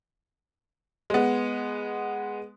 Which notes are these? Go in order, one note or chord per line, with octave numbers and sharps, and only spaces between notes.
G#3 B3